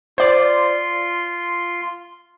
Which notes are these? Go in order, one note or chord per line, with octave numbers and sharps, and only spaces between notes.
F4 C5 D5 C6